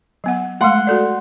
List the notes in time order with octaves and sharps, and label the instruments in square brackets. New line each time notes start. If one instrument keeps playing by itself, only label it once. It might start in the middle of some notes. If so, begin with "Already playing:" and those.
[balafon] F#3 B3 F#5
[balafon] G#3 A3 [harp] F#5 C6
[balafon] F#4 A4 D5